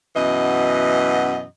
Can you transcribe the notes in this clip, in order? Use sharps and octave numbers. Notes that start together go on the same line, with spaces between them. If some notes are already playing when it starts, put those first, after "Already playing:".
F#2 B2 E3 D#5